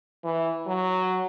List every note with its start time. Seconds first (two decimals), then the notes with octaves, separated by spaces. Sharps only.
0.24 E3
0.67 F#3